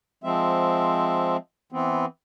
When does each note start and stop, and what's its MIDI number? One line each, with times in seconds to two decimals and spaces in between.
0.24 1.37 53
0.24 1.37 56
0.24 1.37 60
0.24 1.37 76
1.72 2.05 52
1.72 2.05 59
1.72 2.05 60